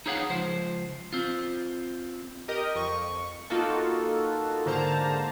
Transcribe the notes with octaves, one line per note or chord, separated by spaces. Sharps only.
D#4 E4 G#4 C#5 F5 F#5
C#2 F3 C5
C4 F4
G4 A#4 D#5
F2 C#6
A#3 D#4 F4 F#4 A4
G#2 D3 A#3 C5 A5 A#5